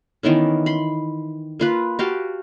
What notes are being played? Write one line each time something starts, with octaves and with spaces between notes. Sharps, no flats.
D#3 E3 B3 C#4
B5 C6
A#3 F4 B4
F#4 G4 F5 A5